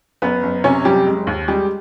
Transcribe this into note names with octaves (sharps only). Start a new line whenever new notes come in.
F#1 B3 B4
F#1
C3 C#4 C#5
F#1 G3 G4
G#3
D#2
G3 G#3 G4